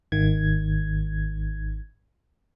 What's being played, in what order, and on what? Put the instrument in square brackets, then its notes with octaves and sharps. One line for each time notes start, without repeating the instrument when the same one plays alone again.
[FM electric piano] G#1 D#3 G#6